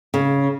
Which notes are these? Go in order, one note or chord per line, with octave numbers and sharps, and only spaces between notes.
C#3